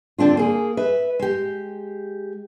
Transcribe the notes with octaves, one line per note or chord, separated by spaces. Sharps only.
D3 C4 D4 F4
A#3 G#4
B4 E5
G#3 G4